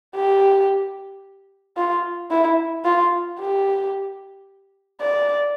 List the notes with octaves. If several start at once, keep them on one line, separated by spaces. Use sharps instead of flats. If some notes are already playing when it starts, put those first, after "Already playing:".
G4
F4
E4
F4
G4
D5